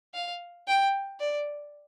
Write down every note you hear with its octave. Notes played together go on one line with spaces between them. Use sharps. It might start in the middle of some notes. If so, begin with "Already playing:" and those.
F5
G5
D5